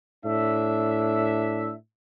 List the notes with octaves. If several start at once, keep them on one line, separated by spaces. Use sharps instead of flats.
A2 D4 E5